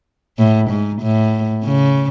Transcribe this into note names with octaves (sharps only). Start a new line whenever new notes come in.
A2
G#2
A2
C#3